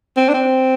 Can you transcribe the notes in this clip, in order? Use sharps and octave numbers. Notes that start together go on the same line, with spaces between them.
C4
D4
C4